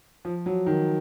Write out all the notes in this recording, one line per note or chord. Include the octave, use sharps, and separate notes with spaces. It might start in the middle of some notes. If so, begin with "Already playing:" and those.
F3
F#3
D#3